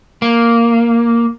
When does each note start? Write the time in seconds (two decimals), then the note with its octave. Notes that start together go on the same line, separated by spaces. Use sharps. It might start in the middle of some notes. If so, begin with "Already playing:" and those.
0.22 A#3